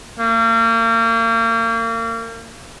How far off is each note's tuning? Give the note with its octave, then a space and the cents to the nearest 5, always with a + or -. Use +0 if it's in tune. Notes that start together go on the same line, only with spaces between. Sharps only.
A#3 -35